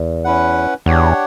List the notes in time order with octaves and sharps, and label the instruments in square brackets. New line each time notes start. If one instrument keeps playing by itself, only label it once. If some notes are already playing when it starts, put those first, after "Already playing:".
Already playing: [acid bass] E2
[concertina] C#4 E4 B4 F#5
[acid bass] E2 [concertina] D4 G4 C#5 F#5